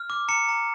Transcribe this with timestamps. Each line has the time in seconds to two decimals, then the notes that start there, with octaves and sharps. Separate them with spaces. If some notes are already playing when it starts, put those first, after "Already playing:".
Already playing: F6
0.10 D6
0.28 A#5 C#7
0.49 A#5